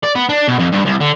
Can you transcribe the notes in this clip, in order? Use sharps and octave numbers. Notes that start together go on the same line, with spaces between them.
D5
B3
D4
B2
F2
G2
C2
D3